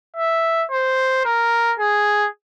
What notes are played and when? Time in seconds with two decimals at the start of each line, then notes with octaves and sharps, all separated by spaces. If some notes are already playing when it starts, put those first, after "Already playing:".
0.16 E5
0.71 C5
1.25 A#4
1.79 G#4